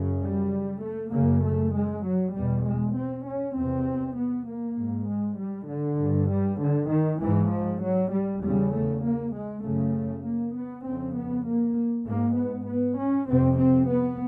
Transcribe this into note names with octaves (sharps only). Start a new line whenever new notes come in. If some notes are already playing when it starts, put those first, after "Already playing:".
Already playing: F#2 C#3
G3
A3
F#2 C#3 A#3
A3
G#3
F#3
E2 B2 G3
G#3
C4
C#4
E2 C3 C4
B3
A#3
G#2
G#3
G3
D3
G2
G3
D3
D#3
G#2 E3
F3
F#3
G3
E2 C#3 G3
A3
A#3
G#3
F#2 C#3 A3
A#3
B3
F2 C#3 C4
B3
A#3
G#2 A#3
B3
B3
C#4
F2 C3 C4
C4
B3